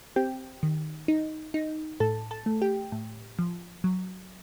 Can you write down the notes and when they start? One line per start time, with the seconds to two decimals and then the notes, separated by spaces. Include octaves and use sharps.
0.16 C4 G4 G5
0.63 D#3
1.08 D#4
1.54 D#4
2.00 A2 A4 A5
2.31 A4 A5
2.46 A3
2.62 G4 G5
2.92 A2
3.39 F3
3.84 F#3